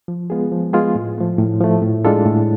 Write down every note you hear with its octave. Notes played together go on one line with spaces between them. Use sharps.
F3
G#3 B3 F4 G#4
F3
G#3 B3 F4 G#4
A2
F3 A3
A2
F3 A3
A2
G#3 D4 F4 A4
A2